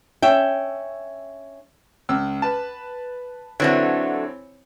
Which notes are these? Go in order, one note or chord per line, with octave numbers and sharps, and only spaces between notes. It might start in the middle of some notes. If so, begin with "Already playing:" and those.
C#4 E5 G5
C#2 E6
B4 A5
D3 E3 F#3 A3 C4 C#5